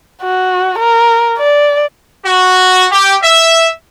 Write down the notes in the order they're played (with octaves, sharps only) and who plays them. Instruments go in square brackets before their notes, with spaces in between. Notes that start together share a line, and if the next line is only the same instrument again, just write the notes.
[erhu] F#4
A#4
D5
[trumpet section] F#4
G4
E5